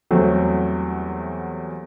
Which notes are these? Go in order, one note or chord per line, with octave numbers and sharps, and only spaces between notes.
E2 F#3 G3 A3 C4